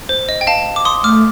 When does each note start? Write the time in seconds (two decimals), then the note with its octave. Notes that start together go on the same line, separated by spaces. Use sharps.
0.09 C5
0.29 D#5
0.41 G5
0.47 F5 A5
0.76 D6
0.85 C6 D#6
1.04 A3 D6 F6